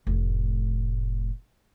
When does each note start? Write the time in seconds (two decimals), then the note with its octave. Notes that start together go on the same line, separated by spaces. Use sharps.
0.07 F1 A2